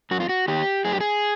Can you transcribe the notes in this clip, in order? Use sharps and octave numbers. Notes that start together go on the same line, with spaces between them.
F#2 F#4
F4
F#4
D#3 G4
F#2 G#4
G4
G#4